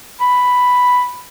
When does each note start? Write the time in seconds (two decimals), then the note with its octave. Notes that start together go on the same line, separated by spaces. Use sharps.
0.20 B5